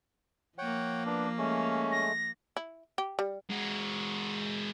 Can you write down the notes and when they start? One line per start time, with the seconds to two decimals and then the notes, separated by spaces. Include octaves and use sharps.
0.58 F3 A#3 C#5 F#5 G5
1.06 B3 D4
1.38 G#3 A3 C#4
1.92 A#6
2.57 E4
2.98 G4
3.19 G3
3.50 G#3 F#4